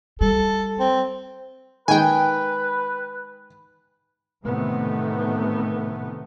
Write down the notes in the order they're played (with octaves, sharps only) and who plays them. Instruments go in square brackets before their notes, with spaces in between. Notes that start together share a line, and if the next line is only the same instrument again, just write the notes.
[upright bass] G3 [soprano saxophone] A4
[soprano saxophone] C4
[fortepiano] D#3 G#3 [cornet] B4 [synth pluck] G5 G#5
[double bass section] A2 C3 D#3 E3 A3 B3